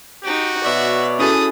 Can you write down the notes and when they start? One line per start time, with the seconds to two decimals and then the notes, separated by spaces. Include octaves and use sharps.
0.24 D#4 F#4 G4
0.63 B2 C#5 D5 E5
1.19 C#4 E4 F#4 G#4 A4 D#6